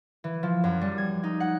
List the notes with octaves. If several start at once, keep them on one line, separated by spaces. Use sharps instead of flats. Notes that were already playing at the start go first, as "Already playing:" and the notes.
E3
F3
F#2
G3
G#6
D#4
F#5